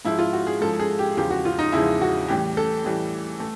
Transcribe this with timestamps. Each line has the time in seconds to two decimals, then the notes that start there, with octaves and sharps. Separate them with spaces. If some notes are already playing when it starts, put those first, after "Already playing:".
0.05 G#2 F3 G#3 E4
0.19 F4
0.33 F#4
0.47 G#4
0.61 G#2 F3 G#3 A4
0.80 G#4
0.99 G4
1.17 E2 C#3 F3 G#3 G4
1.30 F#4
1.45 F4
1.59 D#4
1.72 E2 C#3 F3 G#3 E4
2.01 F#4
2.28 A2 E3 G3 G4
2.57 A4
2.84 A2 E3 G3
3.40 A3